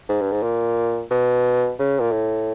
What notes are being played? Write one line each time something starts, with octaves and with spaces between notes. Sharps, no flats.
G#2
G2
G#2
A#2
B2
C#3
A#2
A2